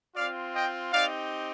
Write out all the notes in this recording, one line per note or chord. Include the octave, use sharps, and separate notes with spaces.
C4 F4 D5 F5
D#5 G5
C4 D#4 G4 D5 F5